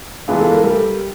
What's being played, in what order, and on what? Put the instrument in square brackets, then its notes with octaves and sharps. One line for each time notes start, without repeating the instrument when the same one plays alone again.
[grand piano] E3 G#3 B3 D4 F4 [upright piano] G#4
[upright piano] A4
A#4
[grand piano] G3 [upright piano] A4